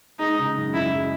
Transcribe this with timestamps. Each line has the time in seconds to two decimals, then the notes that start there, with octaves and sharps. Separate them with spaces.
0.20 G#3 D#4
0.39 C#3
0.56 F#2
0.74 F#2 E4
0.92 G#3